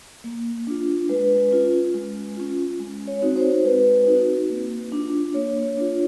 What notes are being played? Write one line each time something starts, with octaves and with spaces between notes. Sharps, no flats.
A#3
D4 F4
G#3 B4
C#4 F4
G#3
C#4 F4
G#3
C#5
C4 D#4 F#4
C5
G#3 B4
C4 D#4 F#4
A#3
D4 F4
A#3 C#5
D4 F4